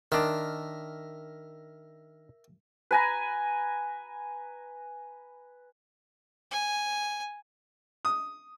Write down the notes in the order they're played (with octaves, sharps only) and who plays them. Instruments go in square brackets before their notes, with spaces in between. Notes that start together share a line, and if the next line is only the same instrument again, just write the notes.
[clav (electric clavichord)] D#3 D4 [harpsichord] A#4 E5
[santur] B4 G#5 A#5
[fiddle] G#5
[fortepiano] D#6